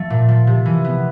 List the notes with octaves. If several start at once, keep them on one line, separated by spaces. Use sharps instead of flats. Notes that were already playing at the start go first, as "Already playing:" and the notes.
Already playing: F3 A3
A#2
F3
C3
E3
B3